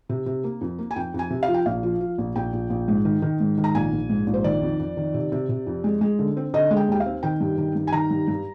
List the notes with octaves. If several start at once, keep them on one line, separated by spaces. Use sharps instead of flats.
C3
C3
A#3
F2
A#3
G#5
F2 G5
F2 G#5
C3
F5
F3
G5
A#1 F5
F3
F3
A#1
A#1 G5
A#1
A#1
G#2
D#3
D#3
G#2
D#3
A#5
A#1 G#5
A#1
G#2
A#1
C5
D#3 D5
F2
F2
D#3
C3
C3
C3
F2
G#3
G#3
D3
C4
D3 D#5
G#3
G5
D#2 G5
F5
C4
D#3 G5
G2
D#3
G2
G#5
D#3 A#5
G2
G2